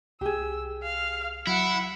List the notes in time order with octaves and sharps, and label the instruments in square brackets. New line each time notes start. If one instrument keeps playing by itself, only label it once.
[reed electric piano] C2 [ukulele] G4 G#4 [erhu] E6
[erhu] F5
[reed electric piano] F#3 [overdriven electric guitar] E4 [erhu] F#5